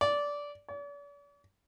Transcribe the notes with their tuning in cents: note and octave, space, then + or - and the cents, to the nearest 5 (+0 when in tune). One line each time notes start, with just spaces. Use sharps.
D5 -15
D5 -45